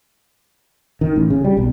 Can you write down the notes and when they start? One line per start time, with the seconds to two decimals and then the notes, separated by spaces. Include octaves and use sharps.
1.01 D#3
1.16 A1
1.30 C#3
1.45 G3
1.57 B1